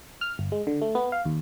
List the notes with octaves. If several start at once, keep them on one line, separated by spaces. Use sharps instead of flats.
F6
G1
G#3
D3
A3
B3
F5
D#2